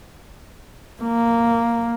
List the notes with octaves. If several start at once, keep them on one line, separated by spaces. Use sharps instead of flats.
A#3